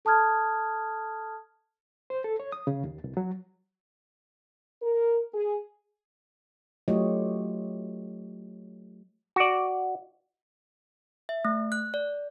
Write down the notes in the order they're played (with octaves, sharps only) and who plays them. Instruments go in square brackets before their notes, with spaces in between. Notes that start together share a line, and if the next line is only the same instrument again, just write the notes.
[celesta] A4 A5 D#6 F6 G#6
[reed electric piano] C5
A4
C#5
D#6
C#3
D#2
C2
F#3
[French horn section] A#4
G#4
[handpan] F#3 A3 F4 G4 C#5 D#5
[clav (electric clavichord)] F#4 D5
[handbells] E5
A3
F#6
D5